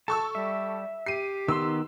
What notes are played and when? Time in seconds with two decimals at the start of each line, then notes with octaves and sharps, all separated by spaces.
0.08 A4 A5 C#6 E6
0.35 G3 E5
1.06 G4 C7 D#7
1.48 D#3 B3 C6 E6